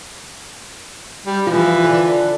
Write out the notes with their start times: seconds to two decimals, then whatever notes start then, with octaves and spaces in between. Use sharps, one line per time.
1.26 G3
1.47 E3 F3 F4
1.84 D3